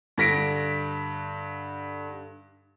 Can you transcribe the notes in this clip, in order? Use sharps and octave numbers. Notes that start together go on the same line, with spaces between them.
G2 D3 A#6 B6 D7